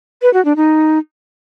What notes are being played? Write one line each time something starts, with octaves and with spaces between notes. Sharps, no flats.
B4
F#4
D4
D#4